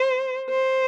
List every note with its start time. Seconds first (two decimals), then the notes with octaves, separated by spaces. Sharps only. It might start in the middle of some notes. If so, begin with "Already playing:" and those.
Already playing: C5
0.50 C5